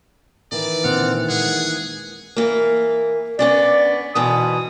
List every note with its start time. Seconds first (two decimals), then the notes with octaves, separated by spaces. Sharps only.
0.52 D#3 E3 D5
0.84 A#2 D3 C4 F#5 F6
1.29 G#3 A#3 G#4 F#5
2.37 E3 A#3
3.39 B3 C#4 D4 D5
4.15 G#2 B2 E3 D#6